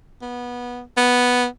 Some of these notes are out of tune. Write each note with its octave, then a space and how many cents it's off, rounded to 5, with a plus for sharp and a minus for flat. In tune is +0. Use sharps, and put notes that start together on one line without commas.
B3 -20
B3 -5